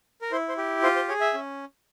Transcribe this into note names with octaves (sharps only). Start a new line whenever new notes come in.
A#4
E4 C5
C5
G4
F4 C5
C5
G#4 C#5
E5
C#4